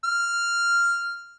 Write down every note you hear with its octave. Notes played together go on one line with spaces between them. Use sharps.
F6